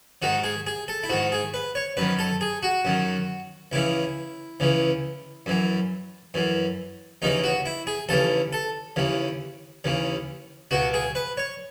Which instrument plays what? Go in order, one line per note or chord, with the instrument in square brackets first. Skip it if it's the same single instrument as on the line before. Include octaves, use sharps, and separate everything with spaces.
[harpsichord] G#2 D#3 F#4
G#4
G#4
A4
E4
G#2 D#3 F#4
G#4
B4
C#5
F#2 D#3 B4
A4
G#4
F#4
F#2 D#3
C#2 C#3 E3 E4
C#2 C#3 E3
F#2 E3
F#2 E3
D#2 C#3 E3 D#4
F#4
E4
G#4
D#2 C#3 E3 A4
A4
D#2 C#3 E3
D#2 C#3 E3
C#2 B2 F#4
G#4
B4
C#5